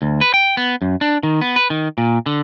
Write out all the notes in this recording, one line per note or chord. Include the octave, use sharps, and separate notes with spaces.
D2
B4
G5
B3
F#2
D4
D#3
B3
B4
D#3
A#2
D3